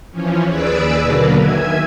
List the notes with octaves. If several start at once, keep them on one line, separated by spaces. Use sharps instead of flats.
E3 F3 C#4
D#2 G#4 B4 D5 D6 E6
B2 D3 F#3 A#3 A#4 B4
D#3 E5 G#5 G#6